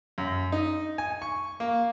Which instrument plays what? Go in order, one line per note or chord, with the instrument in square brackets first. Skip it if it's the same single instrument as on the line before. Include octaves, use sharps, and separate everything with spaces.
[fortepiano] F#2
D#4
G#5
C#6
A#3